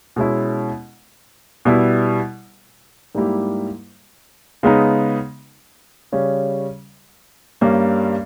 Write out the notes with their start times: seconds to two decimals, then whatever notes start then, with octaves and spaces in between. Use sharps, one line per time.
0.16 B2 G#3 C#4 E4
1.65 B2 G3 B3 E4
3.15 G#2 G3 A#3 E4 G4
4.63 C#3 G#3 B3 D#4
6.12 C#3 G3 C#4
7.61 G2 G3 A#3 C#4